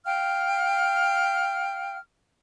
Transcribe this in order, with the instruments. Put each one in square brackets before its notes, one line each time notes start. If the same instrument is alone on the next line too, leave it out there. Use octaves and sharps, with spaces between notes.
[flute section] F5 G5 F6